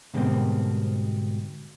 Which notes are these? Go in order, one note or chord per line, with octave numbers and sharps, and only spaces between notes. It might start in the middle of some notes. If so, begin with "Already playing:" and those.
G#2 B2 D3 G3 A#3 C4